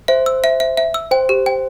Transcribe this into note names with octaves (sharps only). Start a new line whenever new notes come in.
C5 E5
E6
E5
E5
E5
E6
C5 G5
G4
G5